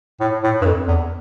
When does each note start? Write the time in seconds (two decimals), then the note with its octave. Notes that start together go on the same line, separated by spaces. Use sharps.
0.20 A2
0.43 A2
0.61 G2
0.65 F2
0.87 E2